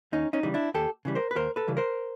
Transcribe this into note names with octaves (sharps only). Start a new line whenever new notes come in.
D#2 C#4 D#4
C#4 D#4
C#3 E3 G3
D4 E4
D#2 G4 A4
C#3 E3 G3
A#4 C5
B4
D#2 A#4 C5
A4 B4
C#3 E3 G3
A#4 C5